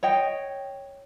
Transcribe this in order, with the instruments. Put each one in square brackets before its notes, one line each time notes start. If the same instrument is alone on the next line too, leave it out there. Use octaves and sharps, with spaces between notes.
[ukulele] C#5 D#5 G5